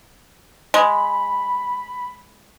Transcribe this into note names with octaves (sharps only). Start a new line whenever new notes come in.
G#3 B5